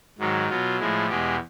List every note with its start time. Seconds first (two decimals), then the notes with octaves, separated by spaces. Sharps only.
0.19 G#2 D#3 F#3
0.49 B2 F#3 F4
0.79 A2 F3 G#3 E4
1.09 E2 B2 G#3 G4